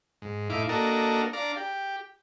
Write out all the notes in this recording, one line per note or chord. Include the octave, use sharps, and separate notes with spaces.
G#2
A2 D#4 E4 F5 D6
A#3 D4 F#4 A4 A#4 D#5
D4 D5 F5 A#5
G4